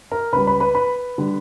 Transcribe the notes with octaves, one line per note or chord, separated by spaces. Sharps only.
A#4 A#5
C#2 C#3 G3 B4 B5
B4 B5
B4 B5
B4 B5
D3 G3